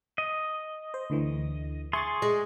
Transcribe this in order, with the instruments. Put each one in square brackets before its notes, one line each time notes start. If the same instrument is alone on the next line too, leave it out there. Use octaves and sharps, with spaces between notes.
[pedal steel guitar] D#5
[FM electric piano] C5
D2 D3 E3
[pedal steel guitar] G#4 C6 [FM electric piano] E5 C#6 A6
[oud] G#3